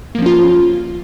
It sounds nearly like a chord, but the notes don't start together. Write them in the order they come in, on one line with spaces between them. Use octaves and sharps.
A#3 F3 C#4 F4